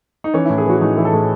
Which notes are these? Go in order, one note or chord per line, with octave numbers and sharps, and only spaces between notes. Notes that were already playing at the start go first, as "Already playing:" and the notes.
D#4
E3 C#4
A2 E4
G#4
E3 F#4
A2 D#4
E3 E4
A4
A2 G#4